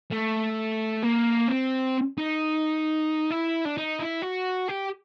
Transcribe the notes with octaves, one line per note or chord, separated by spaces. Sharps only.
A3
A#3
C4
D#4
E4
D4
D#4
E4
F#4
G4